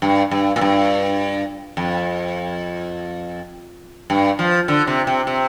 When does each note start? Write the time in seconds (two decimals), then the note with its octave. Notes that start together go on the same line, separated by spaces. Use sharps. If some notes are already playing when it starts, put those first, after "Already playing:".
0.02 G2
0.31 G2
0.56 A#2
0.61 G2
1.77 F2
4.10 G2
4.39 F3
4.68 D3
4.87 C3
5.07 C3
5.27 C3